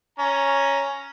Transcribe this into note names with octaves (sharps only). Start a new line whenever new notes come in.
C#4 A#5